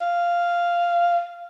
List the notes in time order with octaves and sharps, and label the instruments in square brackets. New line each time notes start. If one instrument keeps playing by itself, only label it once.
[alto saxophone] F5